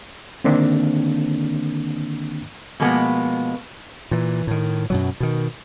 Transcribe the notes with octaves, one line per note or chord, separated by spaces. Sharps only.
D3 D#3 A#3 C4 D4
B2 F3 G#3 A#3 B3 B4
A#2 E3
A2 D#3
F#2 B2 F#3
B2 D#3